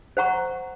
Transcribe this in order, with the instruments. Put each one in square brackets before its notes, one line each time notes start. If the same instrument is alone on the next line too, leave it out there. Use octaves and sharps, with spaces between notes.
[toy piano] C5 F#5 A#5 C#6